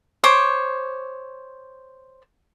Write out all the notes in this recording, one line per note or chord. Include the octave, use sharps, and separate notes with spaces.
C5 C#5 D6